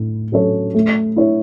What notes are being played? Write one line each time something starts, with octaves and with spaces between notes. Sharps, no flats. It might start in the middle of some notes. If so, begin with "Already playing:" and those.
Already playing: A2
F#3 C#4 A4 C#5
A3
E4 C#5